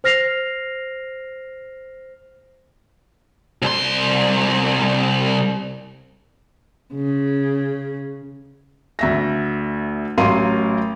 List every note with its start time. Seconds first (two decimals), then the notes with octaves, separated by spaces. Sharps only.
0.04 C5 F6 A#6 C7 F7
3.62 C2 C6
6.94 C#3
8.99 D2 E5 A#6
10.18 A1 F#3 A#4 F5 C6 D#7